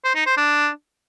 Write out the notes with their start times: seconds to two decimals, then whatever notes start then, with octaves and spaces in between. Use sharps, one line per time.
0.04 C5
0.15 D#4
0.26 C5
0.37 D4